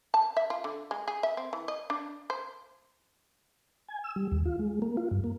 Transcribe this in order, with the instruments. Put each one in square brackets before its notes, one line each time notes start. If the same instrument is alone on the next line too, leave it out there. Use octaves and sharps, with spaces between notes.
[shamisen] A5
E5
F4
D3
G#3
G#4
E5
C4
E3
D#5
D4
C5
[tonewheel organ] G#5
E6
G3
D#2
F4
G#3
A#3
F4
G2
A#3